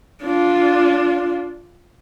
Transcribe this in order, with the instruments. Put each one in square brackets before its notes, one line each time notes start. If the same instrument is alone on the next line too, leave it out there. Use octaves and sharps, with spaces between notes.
[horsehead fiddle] D4 F4